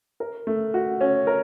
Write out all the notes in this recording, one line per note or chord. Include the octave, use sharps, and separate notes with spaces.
A#4
A3
F#4
C#4
A#4